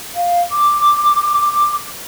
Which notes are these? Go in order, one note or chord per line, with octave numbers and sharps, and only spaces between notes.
F5
D6